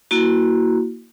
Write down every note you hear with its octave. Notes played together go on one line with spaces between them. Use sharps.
A#3 E4 F#4